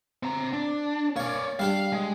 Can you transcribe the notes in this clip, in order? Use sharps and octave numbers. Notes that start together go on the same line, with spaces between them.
C4 A#5
D4
A#3 C#4 C#5 D5
G3 D4 G4 F5
G#3